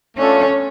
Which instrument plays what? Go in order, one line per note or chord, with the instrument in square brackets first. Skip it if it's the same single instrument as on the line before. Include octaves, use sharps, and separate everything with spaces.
[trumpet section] A3 D4 F4 A4 [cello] C#4